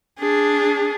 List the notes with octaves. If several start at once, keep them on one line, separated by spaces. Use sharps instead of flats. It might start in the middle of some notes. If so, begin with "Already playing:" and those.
D4 G#4